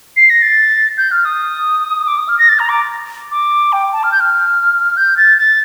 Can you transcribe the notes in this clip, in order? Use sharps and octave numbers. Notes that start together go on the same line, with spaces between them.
C7
A#6
A6
G6
F6
D#6
D6
D#6
F6
A#6
A6
A#5
D6
D6
G5
A5
F6
G6
F6
G6
A6
A6